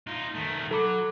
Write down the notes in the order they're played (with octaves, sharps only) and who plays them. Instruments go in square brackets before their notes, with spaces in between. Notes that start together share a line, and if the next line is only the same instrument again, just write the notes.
[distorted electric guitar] D#4 F4
D#3 A3
[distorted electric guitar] F#3 [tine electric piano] A4 B5 D6